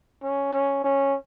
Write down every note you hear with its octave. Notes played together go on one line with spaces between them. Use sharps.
C#4
C#4
C#4